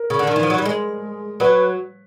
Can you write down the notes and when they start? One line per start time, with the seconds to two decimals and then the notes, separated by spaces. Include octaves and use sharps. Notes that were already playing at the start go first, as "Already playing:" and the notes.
Already playing: A#4
0.10 C#3
0.19 D3
0.27 D#3
0.36 E3
0.43 F3
0.50 F#3
0.58 G3
0.65 G#3
1.40 F#3 B4